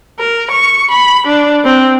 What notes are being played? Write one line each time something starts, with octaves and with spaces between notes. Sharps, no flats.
A#4
C#6
B5
D4
C4